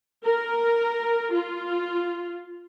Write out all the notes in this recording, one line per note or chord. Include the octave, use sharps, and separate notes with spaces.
A#4
F4